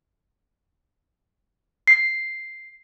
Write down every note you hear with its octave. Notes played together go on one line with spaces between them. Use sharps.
C7